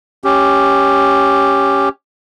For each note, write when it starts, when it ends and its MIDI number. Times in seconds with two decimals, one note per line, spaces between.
0.24 1.89 61
0.24 1.89 67